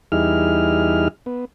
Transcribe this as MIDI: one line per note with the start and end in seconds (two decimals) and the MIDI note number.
0.12 1.08 40
0.12 1.08 55
0.12 1.08 63
0.12 1.08 64
0.12 1.08 68
0.12 1.08 89
1.26 1.45 59